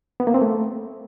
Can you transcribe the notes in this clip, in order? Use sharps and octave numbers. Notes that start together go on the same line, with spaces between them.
B3
A#3
C4
A3